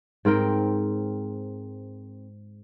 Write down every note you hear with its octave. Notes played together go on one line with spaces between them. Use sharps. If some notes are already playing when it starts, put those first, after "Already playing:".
G#2 C4 A#4 G5